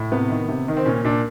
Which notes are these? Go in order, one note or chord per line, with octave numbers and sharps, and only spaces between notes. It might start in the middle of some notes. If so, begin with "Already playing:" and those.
Already playing: A2
C3 B3
D#3
C3
D#3
C4
A#2 C#4
A#2 D4